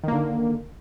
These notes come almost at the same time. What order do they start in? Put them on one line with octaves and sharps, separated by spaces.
D#3 A#3 D3